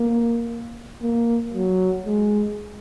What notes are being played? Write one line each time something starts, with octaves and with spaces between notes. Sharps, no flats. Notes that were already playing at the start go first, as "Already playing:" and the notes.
Already playing: A#3
A#3
F#3
G#3